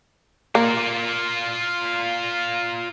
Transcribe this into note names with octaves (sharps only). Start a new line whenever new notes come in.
A#3 F4 D5